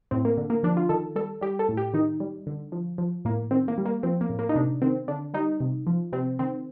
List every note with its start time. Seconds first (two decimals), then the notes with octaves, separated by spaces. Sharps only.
0.11 A2 C4
0.25 A#3
0.37 D3
0.50 A#3
0.63 F3 D4
0.77 F4
0.89 D#3 A4
1.16 G3 A4
1.41 G3 G4
1.59 A4
1.69 A2
1.77 G4
1.94 D#3 D#4
2.20 G3
2.47 D3
2.72 F3
2.98 F3
3.25 A2 A#3
3.51 D#3 C4
3.68 A#3
3.78 G3
3.86 A#3
4.03 F3 C4
4.21 A#3
4.30 A2
4.39 A#3
4.49 D#4
4.55 C3 D4
4.82 D#3 C4
5.08 D3 D4
5.34 G3 D#4
5.60 C3
5.87 F3
6.13 C3 C4
6.39 D#3 C4